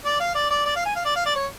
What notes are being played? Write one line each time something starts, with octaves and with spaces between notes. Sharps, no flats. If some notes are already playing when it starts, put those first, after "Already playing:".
D5
F5
D5
D5
D5
F5
G#5
F5
D5
F5
D5
C#5